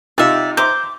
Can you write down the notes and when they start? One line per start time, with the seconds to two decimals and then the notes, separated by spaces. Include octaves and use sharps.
0.18 C3 D#4 F4 D5 E5
0.57 C5 E5 A#5 D6 G6